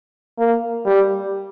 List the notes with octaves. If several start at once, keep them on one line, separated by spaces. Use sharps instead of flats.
A#3
G3